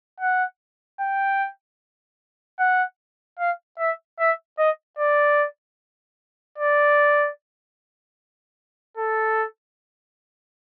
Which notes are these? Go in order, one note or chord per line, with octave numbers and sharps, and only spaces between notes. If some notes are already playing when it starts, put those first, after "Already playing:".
F#5
G5
F#5
F5
E5
E5
D#5
D5
D5
A4